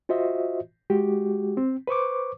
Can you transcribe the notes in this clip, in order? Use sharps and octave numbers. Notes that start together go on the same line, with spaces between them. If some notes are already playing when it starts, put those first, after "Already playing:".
F4 F#4 C5 D#5 E5
G#3 F#4 G4
C4
B4 C5 C#6 D6